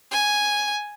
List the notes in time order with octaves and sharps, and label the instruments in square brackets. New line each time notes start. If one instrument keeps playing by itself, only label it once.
[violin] G#5